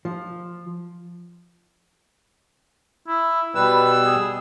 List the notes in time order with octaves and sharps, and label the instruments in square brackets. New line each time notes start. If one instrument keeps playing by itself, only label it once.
[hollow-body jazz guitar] F3
[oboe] E4
[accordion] B2 G3 E6 [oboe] B4
[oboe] G#4